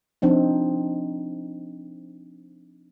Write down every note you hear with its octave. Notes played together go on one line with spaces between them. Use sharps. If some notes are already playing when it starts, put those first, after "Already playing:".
F3 C4 D4 D#4